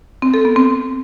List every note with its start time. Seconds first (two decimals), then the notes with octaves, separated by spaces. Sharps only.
0.22 C4
0.34 A4
0.45 B3
0.56 C4